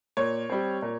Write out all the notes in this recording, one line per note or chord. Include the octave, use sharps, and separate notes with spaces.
A#2 C#5
G3 C4
A#2